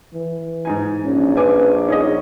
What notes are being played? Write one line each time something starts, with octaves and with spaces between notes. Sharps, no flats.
E3
G#2 D#4 G#5
A#1 C#4
B4 G#5 D6
C#4 D#4 G#4 D#5